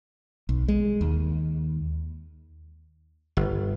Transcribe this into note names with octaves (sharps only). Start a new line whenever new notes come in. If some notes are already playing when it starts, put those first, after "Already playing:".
B1
G#3
D#2
G1